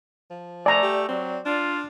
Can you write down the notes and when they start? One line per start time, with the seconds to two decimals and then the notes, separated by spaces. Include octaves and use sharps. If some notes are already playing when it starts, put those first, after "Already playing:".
0.30 F3
0.66 A3 D5 G#5 A#5
0.83 G4
1.08 F#3 C4
1.45 D4 F4